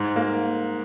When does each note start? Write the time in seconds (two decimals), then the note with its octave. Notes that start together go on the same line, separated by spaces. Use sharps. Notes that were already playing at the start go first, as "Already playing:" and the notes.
Already playing: G#2
0.16 A#3